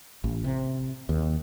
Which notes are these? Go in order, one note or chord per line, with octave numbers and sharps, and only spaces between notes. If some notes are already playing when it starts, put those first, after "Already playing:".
A1
C3
D#2